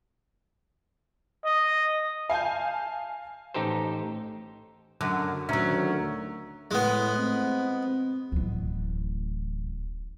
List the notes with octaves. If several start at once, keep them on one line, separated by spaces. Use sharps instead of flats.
D#5
F5 G#5 A5 G6
A1 D#4 G4 A4 C5
F#2 D3
D2 D#3 F#3 C#4 E5 A#5 E6
A2 G#3 B3
C4
D1 A1